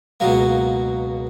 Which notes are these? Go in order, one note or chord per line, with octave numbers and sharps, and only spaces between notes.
C#2 B2 F#3 A#3